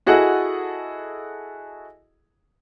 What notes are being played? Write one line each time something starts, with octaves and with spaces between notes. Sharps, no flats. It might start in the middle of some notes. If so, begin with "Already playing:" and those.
E4 F#4 G#4 A4 D#5 F#5